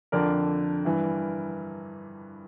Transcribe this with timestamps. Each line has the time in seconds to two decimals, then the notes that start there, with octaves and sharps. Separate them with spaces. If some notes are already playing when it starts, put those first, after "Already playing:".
0.12 F2 D3 A#4 D5
0.85 G2 E3